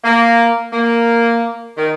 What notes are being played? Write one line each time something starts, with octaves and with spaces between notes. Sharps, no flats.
A#3
A#3
D#3